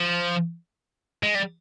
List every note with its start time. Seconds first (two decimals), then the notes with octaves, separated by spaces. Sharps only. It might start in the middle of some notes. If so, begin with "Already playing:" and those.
Already playing: F3
1.23 G#3
1.35 G3